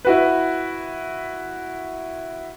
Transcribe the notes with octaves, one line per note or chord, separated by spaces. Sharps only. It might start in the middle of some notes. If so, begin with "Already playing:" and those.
E4 F#4 B4